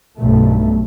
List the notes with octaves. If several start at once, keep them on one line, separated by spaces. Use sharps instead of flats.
B1 G2 A3